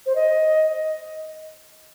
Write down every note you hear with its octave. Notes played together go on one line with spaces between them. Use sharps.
C5
D#5